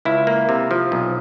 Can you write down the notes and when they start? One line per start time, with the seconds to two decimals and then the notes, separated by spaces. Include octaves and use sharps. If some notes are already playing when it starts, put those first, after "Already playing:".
0.05 C#2 E4
0.27 A#3
0.49 C3
0.71 F3
0.92 B1